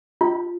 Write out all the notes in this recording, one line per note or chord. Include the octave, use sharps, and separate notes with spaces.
F4